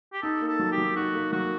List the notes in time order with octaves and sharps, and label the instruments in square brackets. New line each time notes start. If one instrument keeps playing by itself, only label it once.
[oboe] G4
[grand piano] D#4 [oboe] A4
[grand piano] A#3
[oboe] A4
[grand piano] F#3
[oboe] G4
[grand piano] F#3
[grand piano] D#4 [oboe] F#4
[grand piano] A#3
[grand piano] F#3 [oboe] F#4